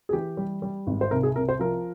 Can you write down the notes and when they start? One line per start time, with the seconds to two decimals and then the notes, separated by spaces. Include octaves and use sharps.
0.09 G#4
0.13 E3 G4
0.37 G3
0.62 G3
0.87 G#1
1.01 C5
1.11 C2 A#4
1.23 G#4
1.36 C2 A#4
1.49 C5
1.60 F3 A#4